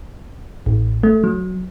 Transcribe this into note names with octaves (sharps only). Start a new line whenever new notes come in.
A1
A3
F#3